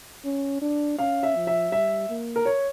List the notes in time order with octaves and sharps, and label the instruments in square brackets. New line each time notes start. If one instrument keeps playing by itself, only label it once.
[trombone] C#4
D4
[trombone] C#4 [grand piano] F5
[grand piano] E5
[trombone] F3
[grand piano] E5
[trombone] G3 [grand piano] E5
[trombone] A#3
[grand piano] A#4
C#5